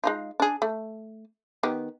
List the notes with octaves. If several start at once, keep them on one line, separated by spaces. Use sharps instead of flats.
G#3 D#4 F4
D4 G#4
A3
D#3 B3 G4